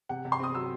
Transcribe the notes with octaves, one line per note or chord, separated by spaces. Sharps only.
C3 F#5
C3
C6
C4 D#6
F#3 E6